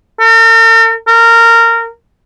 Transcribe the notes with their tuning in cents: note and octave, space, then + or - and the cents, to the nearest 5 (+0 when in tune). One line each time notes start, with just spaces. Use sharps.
A#4 -45
A#4 -20